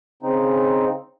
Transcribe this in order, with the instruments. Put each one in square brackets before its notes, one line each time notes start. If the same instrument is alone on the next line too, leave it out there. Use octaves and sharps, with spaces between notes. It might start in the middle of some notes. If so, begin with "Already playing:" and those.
[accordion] C#3 C4 D#4